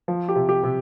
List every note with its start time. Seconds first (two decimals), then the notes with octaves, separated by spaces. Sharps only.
0.08 F3
0.29 G4
0.35 C3
0.49 G4
0.63 C3